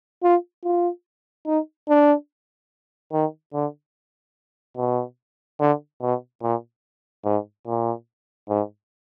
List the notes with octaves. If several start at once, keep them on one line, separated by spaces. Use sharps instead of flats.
F4
F4
D#4
D4
D#3
D3
B2
D3
B2
A#2
G#2
A#2
G#2